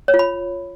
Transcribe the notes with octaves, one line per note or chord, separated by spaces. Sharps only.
C#5
F4
B5